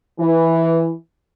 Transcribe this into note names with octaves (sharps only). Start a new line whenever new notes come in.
E3